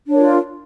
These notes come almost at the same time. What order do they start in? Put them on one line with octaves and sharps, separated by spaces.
D4 C#5 A#4 F4